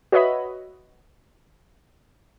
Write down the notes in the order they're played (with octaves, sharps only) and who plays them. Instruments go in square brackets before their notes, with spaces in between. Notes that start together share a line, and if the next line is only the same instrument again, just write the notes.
[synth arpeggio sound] F#4 B4 C#5 D#5 E5 B5